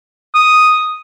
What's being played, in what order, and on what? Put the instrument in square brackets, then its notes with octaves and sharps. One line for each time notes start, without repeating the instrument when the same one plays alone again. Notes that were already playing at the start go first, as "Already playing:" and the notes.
[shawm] D#6